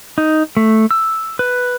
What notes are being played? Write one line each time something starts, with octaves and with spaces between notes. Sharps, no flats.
D#4
A3
E6
B4